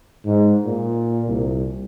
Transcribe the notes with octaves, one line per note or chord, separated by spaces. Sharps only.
G#2
A#2
C2